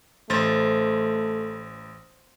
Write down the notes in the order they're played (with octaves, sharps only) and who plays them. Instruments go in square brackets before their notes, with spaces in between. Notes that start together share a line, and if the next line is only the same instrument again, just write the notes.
[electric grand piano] A1 A6 [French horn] A3 [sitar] C5